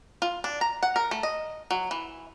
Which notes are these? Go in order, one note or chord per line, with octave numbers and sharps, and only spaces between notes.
F4
D4
A#5
F#5
A#4
A3
D#5
F#3
E3